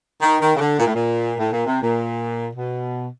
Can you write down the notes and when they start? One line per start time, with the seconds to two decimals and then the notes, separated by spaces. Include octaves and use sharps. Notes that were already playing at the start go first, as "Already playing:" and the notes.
0.22 D#3
0.41 D#3
0.56 C#3
0.60 D3
0.80 A#2
0.87 A2
0.94 A#2
1.38 A2
1.52 A#2
1.66 C3
1.81 A#2
2.54 B2